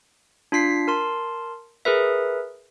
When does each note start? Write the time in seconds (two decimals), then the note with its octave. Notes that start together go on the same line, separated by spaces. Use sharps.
0.52 D4 F4 B6 C7
0.88 A#4 A5 C6
1.85 G#4 A#4 B4 E5